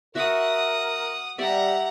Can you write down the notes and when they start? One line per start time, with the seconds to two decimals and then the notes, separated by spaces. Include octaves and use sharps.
0.15 F#4 A#4 E5 F#5 D#6
1.38 G3 G4 D5 E5 F#5 A#5